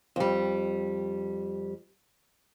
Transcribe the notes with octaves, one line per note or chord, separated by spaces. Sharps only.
F2 G3